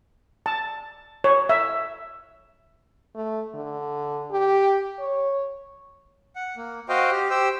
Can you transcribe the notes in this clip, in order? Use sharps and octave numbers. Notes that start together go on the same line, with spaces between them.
A5
C#5
E5
A3
D3
G4
C#5
F#5
A#3
F#4 C5 D#5 F5 G5
G4
G4 C5 G5 E6